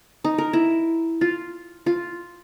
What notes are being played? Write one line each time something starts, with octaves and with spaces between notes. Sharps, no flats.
D#4
A#4
E4
F4
F4